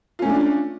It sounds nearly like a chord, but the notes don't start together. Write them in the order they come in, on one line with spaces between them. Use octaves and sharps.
F4 C#4 A3 D4